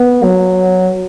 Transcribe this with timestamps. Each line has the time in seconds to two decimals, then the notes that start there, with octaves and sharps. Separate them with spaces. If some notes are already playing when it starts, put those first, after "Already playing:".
Already playing: B3
0.23 F#3